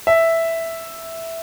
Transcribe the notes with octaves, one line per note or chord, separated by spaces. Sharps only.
E5